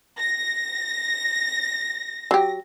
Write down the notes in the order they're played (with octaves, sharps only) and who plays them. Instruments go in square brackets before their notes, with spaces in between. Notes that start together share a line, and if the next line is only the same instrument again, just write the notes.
[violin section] A#6
[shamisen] F#3 G4